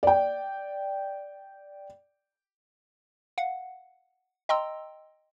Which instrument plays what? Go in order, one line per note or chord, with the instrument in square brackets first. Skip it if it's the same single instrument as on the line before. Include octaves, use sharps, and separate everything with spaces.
[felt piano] D5 G5
[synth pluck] F5 F#5
D#5 G5 A#5 C6 E6